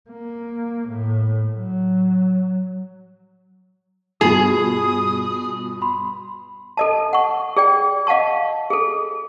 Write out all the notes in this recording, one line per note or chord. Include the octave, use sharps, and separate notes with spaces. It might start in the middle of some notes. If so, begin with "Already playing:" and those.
A#3
A2
F#3
G2 B2 F4 G#4 D#6
B5 C6
A4 D#5 A5
F#5 C#6
G#4 D5 G5
D#5 F5 F#5 A5 C#6
G#4 A4